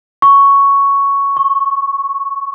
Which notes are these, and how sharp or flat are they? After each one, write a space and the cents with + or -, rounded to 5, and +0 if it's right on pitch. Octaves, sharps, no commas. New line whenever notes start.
C#6 +5
C#6 -25